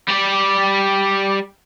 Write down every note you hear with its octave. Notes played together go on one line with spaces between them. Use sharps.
G3 D5